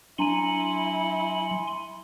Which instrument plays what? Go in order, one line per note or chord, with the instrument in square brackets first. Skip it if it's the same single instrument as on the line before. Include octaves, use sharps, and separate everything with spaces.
[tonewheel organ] F#3 [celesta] D4 A#5 D#7 [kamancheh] E4 [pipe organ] G#5 C6